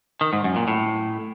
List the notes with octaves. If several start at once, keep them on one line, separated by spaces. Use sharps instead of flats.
D#3
G#2
F#2
A#2
A2